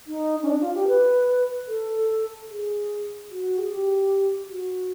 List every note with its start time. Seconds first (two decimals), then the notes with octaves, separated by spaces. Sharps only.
0.07 D#4
0.42 C#4
0.47 D4
0.60 F4
0.74 G4
0.87 B4
1.68 A4
2.50 G#4
3.30 F#4
3.58 G#4
3.71 G4
4.45 G4
4.51 F#4